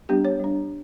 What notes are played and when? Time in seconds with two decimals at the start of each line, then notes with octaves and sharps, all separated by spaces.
0.09 G3 B3 D4 G4
0.25 C#5
0.40 G3 D4